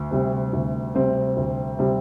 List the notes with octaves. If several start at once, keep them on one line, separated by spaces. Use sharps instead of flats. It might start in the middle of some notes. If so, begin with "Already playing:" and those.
Already playing: D2
C3 G3 C4
D2
C3 G3 C4
D2
C3 G3 C4